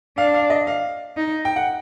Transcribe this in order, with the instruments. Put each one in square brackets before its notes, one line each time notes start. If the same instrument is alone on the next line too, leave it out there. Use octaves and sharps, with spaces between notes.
[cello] D4 [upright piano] F5
[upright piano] F5
D#5
F5
[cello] D#4
[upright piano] G5
F#5